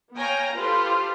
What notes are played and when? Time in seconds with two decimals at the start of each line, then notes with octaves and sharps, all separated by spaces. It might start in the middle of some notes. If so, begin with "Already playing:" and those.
0.16 B3 C#5 F5 G5 G#5 A#5
0.55 F4 G4 A4 B4 C5